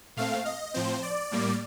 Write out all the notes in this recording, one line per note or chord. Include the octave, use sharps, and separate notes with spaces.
A#2 A3 C4 F5
D#5
A2 F3 C4 C5
D5
A2 G3 A#3